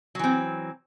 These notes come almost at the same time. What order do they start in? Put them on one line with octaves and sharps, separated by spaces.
F#3 E3 C4